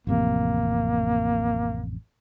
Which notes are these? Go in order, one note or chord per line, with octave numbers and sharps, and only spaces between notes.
A1 F2 C3 A#3